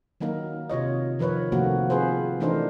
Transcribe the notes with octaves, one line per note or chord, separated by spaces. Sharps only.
D#3 F#3 A#3 D#4 A#4
C3 F4 C#5 D#5
D#3 F3 A#4 B4 C#5
C3 D#3 F3 A3 A#3 F#4
C4 F4 G#4 B4 C5
E3 A3 D4 D#4 A#4 C5